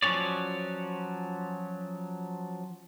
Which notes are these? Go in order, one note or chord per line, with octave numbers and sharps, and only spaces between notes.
F3 F#3 C#4 C#5 D5